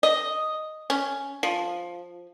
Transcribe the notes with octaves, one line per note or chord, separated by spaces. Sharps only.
D#5
C#4
F3